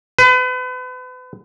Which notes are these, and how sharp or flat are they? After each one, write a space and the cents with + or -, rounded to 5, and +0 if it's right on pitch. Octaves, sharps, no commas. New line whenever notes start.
B4 +35